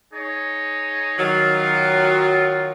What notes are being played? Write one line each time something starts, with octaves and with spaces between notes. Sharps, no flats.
D#4 G#4 C#5
D#3 F#3 F4